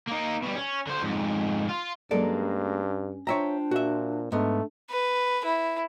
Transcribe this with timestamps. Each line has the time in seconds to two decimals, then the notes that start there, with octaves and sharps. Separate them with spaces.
0.08 A#3 D#4
0.42 B2 G3
0.55 C#4
0.87 D3 C5
1.02 F2 G#2
1.69 F4
2.11 G2 F#3 G#3 A#3 C#4 A4 D5
3.27 D4 F4 C5 C#5 E5 G5 A#5
3.71 A#2 F#4 E5
4.32 G#2 A3 B3 D4
4.91 B4
5.44 E4